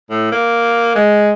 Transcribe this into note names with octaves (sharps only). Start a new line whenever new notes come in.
A2
A#3
G#3